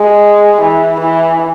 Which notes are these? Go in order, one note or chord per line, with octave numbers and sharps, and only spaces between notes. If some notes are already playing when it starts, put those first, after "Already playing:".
Already playing: G#3
E3
E3